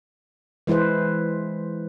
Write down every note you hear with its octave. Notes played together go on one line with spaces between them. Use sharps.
E3 G#3 E4 B4 C5